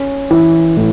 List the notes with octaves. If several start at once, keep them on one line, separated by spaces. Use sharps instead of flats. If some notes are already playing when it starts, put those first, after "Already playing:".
Already playing: C#4
E3
A2